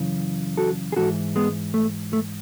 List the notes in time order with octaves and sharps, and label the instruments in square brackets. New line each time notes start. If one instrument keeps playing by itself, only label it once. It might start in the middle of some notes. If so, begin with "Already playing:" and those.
Already playing: [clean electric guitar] F#2 C#3 E3
F#4 A4
G#4
G#2 E3 F#4 A4
G#3 B3
A3
A3